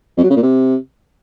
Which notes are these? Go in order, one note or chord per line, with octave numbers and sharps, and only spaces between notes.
F2
F#3
C#3
A#2
C3